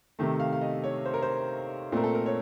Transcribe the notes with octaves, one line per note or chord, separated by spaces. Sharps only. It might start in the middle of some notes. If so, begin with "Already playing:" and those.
C3 D#3 A3
F5
F5
D#5
C#5
C5
A#4
C5
A#2 A3 C4 A#4
A4
A#4
C#5